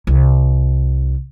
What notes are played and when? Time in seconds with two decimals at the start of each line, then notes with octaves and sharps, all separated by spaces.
0.07 C2